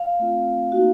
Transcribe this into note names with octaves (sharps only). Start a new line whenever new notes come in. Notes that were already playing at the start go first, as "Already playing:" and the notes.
Already playing: F5
A3 C4 F4
A#3 D#4 F#4